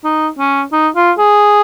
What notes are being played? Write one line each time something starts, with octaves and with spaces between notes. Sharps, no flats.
D#4
C#4
D#4
F4
G#4